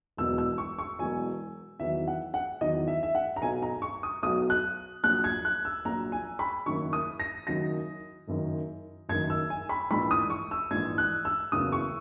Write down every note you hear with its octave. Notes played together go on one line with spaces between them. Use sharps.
E1 E2 B2 F#3 E6
E6
C#6
C#6
E1 E2 B2 F#3 G#5
E2 D#3 F#3 E5
F#5
F#5
E2 D#3 F#3 D#5
E5
E5
F#5
A#5
B1 B2 F#3 G#5
A#5
C#6
D#6
B1 B2 F#3 D#6
F#6
A#1 A#2 F#3 F#6
G#6
F#6
E6
A#1 A#2 F#3 A#5
G#5
B5
F#1 F#2 D#3 F#3 C#6
D#6
A#6
F#1 F#2 D#3 F#3 A#6
F#1 F#2 D#3
F#1 F#2 D#3 G#6
E6
G#5
B5
A#1 G#2 E3 B5
D#6
C#6
E6
A#1 G#2 E3 G#6
F#6
E6
F#1 E2 C#3 F#3 D#6
C#6